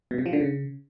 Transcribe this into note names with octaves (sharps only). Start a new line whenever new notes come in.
B2
C3
F3
D3
C#3